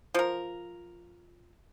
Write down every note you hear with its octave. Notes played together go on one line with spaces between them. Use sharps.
F3 A#4